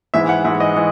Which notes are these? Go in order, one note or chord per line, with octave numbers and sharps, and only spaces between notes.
G#2 E3 E5
F#5
G#2 E3 E5
D#5
E3